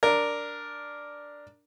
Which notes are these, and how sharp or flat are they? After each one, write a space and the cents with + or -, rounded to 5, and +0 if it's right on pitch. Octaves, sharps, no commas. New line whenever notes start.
D4 +0 A#4 +0